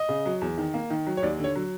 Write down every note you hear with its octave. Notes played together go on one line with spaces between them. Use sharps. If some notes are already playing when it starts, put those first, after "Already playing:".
Already playing: D#5
C#3
F#3
E2
D#3
A#3
D#3
F#3
C#5
D#2 D5
D3
C#5
F#3